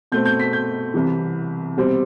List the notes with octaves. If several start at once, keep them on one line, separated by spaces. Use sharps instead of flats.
B2 A3 C4 G6
G6
B6
G6
C2 C3 E3
B2 G3 C4